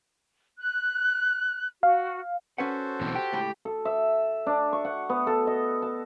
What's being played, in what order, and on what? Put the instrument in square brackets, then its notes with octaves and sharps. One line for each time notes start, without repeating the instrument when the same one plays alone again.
[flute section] F#6
[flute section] F#4 [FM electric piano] F5
[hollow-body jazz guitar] C#4 B4 F#5 [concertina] F#4 A4 C5
[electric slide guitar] B2 E3 C4
[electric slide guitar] G4 [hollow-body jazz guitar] G5
[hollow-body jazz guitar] C#2 A2 G5
[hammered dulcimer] A4
E5
D4
C#6
F#5
B3
A4
D#5
A5